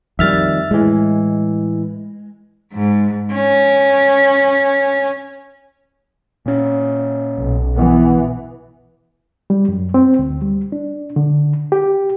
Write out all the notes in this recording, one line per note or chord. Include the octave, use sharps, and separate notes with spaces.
F2 D#3 G3 E5 F6 A6
A2 E3 G#3
G#2
C#4
A#2 C#4
B1
B2 E3 B3
G3
F#2
C4
D2
G3
D4
D3
G4